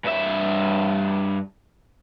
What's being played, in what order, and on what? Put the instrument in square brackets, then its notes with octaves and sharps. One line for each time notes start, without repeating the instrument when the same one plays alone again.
[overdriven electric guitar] G2 E5